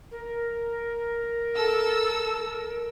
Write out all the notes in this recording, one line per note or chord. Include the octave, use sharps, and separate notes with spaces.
A#4
A4 E6